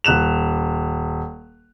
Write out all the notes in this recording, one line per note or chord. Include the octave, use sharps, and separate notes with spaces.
D#1 F#6 E7 F7